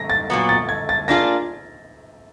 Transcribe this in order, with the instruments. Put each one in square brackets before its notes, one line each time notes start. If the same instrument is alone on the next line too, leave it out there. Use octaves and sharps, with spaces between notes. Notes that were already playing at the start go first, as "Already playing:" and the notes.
Already playing: [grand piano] A#6
A6
[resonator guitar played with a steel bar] A#2 F#3 B3
[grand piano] A6
G#6
A6
[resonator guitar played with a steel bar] A#3 D4 F4 G#4 [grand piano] A#6